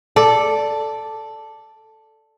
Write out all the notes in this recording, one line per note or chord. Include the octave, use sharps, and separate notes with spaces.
A4 D5